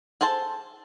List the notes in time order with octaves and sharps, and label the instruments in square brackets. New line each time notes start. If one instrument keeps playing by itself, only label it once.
[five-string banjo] G#4 A4 C5 A5